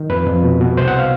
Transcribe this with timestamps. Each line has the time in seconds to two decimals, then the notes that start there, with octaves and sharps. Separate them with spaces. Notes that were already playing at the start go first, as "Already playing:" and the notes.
Already playing: D#3
0.10 F2 B4
0.27 F2
0.44 B2
0.60 B2
0.77 C2 C5
0.88 F#5
0.99 F5